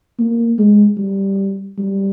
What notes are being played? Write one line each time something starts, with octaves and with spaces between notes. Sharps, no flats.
A#3
G#3
G3
G3